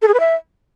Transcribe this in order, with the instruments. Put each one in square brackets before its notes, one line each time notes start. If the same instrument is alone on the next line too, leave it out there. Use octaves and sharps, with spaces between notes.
[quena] A4
G#4
B4
E5